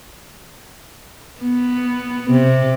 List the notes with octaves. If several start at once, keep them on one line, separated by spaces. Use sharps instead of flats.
B3
C3